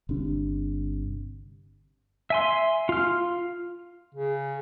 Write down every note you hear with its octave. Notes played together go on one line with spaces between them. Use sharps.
G1 C3 D4
E5 G#5 C6
F4 F6
C#3